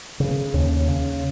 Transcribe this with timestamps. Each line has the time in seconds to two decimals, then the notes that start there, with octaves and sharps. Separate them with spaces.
0.20 C#3
0.54 D#2 C#4
0.88 C#3